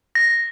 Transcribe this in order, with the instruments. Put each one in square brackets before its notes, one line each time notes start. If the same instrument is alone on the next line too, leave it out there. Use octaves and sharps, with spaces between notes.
[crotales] A#6